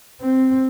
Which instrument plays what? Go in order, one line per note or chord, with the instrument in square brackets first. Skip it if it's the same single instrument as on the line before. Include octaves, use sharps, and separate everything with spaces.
[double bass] C4